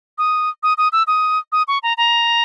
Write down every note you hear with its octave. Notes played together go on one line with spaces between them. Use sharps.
D#6
D#6
D#6
E6
D#6
D#6
C#6
A#5
A#5